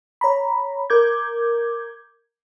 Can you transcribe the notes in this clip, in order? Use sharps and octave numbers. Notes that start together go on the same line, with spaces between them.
C#5 A#5 B5
A#4 D6 G6 G#6